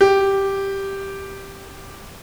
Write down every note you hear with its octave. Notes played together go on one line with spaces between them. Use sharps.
G4